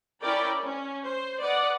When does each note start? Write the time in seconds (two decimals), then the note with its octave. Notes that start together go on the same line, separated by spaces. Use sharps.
0.20 C#4 E4 A#4 D5 G5 B5
0.63 C#4
1.03 C5
1.40 B4 D5 D#5 F#5